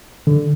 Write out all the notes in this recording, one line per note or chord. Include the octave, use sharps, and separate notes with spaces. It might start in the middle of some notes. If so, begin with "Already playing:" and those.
D3